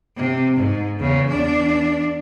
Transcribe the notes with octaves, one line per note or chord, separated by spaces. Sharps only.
C3
G#2
E2 C#3
E2 D4